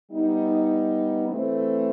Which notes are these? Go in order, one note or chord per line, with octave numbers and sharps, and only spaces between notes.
G3 B3 D#4
E3 A3 C4